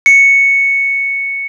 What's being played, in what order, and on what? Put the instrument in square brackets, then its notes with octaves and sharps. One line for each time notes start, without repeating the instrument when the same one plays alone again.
[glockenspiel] C#7